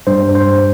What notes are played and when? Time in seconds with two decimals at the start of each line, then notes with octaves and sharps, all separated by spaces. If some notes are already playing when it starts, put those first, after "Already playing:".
0.07 G2 C5
0.35 C5